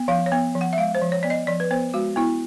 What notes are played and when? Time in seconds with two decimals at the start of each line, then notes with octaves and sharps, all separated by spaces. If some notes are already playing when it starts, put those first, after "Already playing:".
Already playing: B3
0.08 F3 F5
0.26 C#5
0.32 B3
0.55 F3
0.61 F#5
0.73 E5
0.78 G#3 F5
0.95 C5
1.02 F3
1.12 C#5
1.23 B3 D5
1.30 D#5
1.47 F3 D5
1.60 B4
1.71 B3 C5
1.94 G#3 F#4
2.16 B3 E4